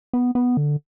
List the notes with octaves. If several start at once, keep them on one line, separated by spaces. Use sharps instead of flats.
B3
B3
D3